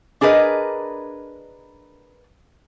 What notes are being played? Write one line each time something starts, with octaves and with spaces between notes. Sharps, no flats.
D4 G#4 A#4 B4 D#5